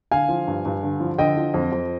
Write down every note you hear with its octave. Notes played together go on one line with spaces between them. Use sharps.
D3 F5 G#5
F3
G2
G2
D3
F3
D3 D#5 G5
F3
F2
F2